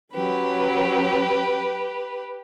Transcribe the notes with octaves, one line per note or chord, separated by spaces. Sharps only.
F#3 C#4 G4 B4